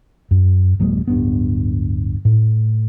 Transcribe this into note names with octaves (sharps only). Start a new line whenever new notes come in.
F#2
D1 F#3 G#3 A#3
D1 G2 B3
A2